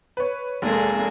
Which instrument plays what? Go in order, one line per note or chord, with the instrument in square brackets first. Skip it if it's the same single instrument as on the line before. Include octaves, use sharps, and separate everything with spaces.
[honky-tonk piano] B4 C#5
[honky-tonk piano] F1 G#3 [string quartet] A#3 G#4 A4